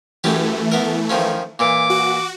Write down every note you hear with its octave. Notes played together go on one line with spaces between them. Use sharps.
F#2 E3 A3 C#4 G4
B3 A#4
D#3 F3 C#4
A#2 E3 D6
F#4